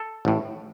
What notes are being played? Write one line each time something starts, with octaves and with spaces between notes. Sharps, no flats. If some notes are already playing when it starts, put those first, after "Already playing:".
Already playing: A4
A1 A2